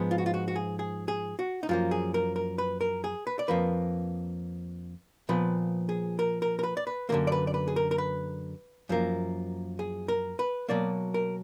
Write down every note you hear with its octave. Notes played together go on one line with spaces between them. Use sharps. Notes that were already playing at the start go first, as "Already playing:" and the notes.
Already playing: G#2 F3 G#3 B3
F4
F#4
F4
F#4
F#4
G#4
G#4
G#4
F#4
D#4
F#2 F3 A#3 F4
G#4
A#4
A#4
B4
A#4
G#4
B4
D5
F2 F3 A#3 B4
A#2 F3 B3 B4
G#4
A#4
A#4
A#4
B4
D5
B4
F#2 D3 F3 A#3 A#4
D5
B4
D5
B4
G#4
A#4
A#4
B4
F#2 F3 A#3
G#4
A#4
B4
B2 F#3 A#3 D5
A#4